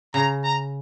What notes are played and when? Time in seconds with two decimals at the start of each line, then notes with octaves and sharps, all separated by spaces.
0.14 C#3 A#5
0.44 A#5